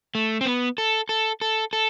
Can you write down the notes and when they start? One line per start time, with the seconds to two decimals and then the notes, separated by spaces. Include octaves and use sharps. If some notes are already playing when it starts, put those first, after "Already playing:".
0.15 A3
0.41 C4
0.46 B3
0.78 A4
1.09 A4
1.41 A4
1.73 A4